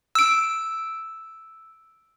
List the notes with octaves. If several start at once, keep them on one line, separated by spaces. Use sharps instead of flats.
E6 D7